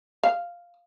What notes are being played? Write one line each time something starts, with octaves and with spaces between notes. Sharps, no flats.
F5